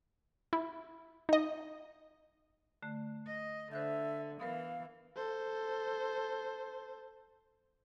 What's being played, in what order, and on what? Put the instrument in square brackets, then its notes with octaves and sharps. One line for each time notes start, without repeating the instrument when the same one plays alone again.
[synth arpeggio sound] E4
D#4 D#5
[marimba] D3 A3
[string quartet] D#5
[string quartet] D3 [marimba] C5 F#6 G6 [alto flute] E5
[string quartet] E3 [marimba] B3 A#4 B4 [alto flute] F5
[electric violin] A4 C5